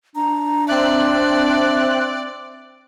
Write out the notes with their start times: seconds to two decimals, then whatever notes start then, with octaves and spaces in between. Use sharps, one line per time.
0.16 D4 A#5
0.68 C4 D5 E5 F#6